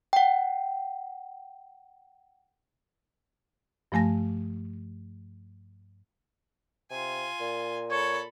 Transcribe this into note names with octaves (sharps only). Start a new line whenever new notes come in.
F#5 G5
G2 F3 A3 G#5 A#6
C3 F4 G#5
A#2
A4 C#5 B5